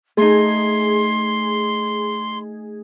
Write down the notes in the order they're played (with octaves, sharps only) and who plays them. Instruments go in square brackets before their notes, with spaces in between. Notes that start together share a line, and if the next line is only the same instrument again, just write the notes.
[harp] A3 D#4 [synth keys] G#4 [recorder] C6